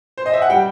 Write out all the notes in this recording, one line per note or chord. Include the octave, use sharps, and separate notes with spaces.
C5
D#5
E5
F#5
G3 G5